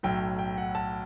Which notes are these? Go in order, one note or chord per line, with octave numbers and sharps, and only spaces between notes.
B1 A2 F#3 G5
G5
F#5
A5